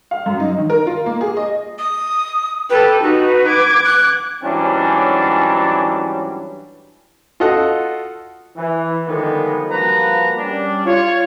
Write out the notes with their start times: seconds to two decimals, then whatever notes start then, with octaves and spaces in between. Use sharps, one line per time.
0.11 F5
0.26 F#2
0.40 D#4
0.58 D#3
0.70 A#4
0.87 F4
1.06 A#3
1.21 G#4
1.37 D#5
1.79 D#6
2.70 G4 A4 B4
3.03 D#4 F#4 B4
3.47 D6 G#6
3.85 F#6
4.43 G#2 E3 F#3 G3 C#4 D4
7.40 F4 F#4 A4 D#5 F#5
8.56 E3
9.07 D3 D#3 F3 G3 G#3 B3
9.71 F3 G3 A#3 F#4 B4 A#5
10.38 G3 C#4 D4
10.85 F4 C#5